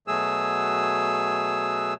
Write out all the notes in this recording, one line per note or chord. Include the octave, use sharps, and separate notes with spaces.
B2 F#3 A3 G#4 E6